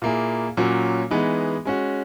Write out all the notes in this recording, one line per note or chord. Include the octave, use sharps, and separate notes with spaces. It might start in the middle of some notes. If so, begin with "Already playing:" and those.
A#2 A#3 E4 G#4
A#2 F#3 A#3 C#4 F#4
E3 G#3 B3 D#4
G#3 C#4 F#4